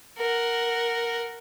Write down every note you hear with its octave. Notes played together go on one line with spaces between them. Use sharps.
A#4 F#5